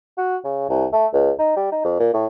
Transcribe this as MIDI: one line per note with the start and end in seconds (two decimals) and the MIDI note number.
0.18 0.37 66
0.44 0.66 49
0.70 0.86 36
0.93 1.07 57
1.14 1.31 37
1.39 1.52 63
1.56 1.71 55
1.72 1.81 63
1.85 1.95 41
2.00 2.09 46
2.14 2.27 45